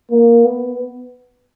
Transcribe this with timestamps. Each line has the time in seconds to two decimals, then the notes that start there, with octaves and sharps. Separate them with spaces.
0.11 A#3
0.45 B3